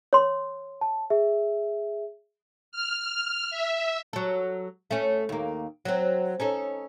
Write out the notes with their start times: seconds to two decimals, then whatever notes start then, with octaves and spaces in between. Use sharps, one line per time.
0.13 C#5 C6
0.81 A5
1.10 G#4 E5
2.72 F6
3.51 E5
4.13 F#3 A4
4.91 A3 C#4
5.29 D#2 A#3
5.85 F#3 C4
6.40 C#4 D#4 A4